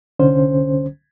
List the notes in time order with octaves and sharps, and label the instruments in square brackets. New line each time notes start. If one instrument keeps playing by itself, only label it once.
[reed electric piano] C2 D3 C#4 C5